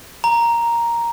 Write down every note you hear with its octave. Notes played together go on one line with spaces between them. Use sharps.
A#5